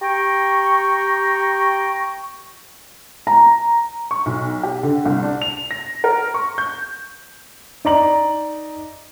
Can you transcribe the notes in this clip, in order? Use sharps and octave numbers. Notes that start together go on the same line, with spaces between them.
G4 G5 A#5 C#6
A#5
C#6
B1
G4
D3
C2
D4
F7
A#6
A#4
C#6
G6
D#4 D5 A#5 F#7